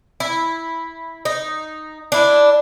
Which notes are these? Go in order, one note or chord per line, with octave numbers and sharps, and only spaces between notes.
E4
D#4
D4 E4